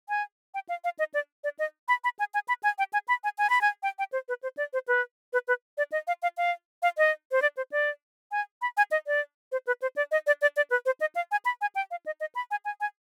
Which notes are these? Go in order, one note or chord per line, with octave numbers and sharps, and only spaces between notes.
G#5
G5
F5
F5
D#5
D5
D5
D#5
B5
B5
G#5
G#5
B5
G#5
G5
G#5
B5
G#5
G#5
B5
G#5
G5
G5
C5
B4
C5
D5
C5
B4
B4
B4
D5
D#5
F5
F5
F5
F5
D#5
C5
D5
C5
D5
G#5
B5
G#5
D#5
D5
C5
B4
C5
D5
D#5
D5
D5
D5
B4
C5
D#5
F5
G#5
B5
G#5
G5
F5
D#5
D#5
B5
G#5
G#5
G#5